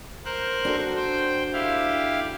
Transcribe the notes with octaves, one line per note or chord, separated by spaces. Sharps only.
A#4 C5 F#6
D4 F#4 A4
C5 G5
E4 G4 F5